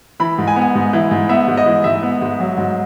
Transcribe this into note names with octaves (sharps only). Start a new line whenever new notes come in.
E3 B5
G#2
G#5
B3
G#5
G#2
E3
G#2
B3 E5
G#2
D#5
E3
G#2 E5
B3
G#2
F#3
G#2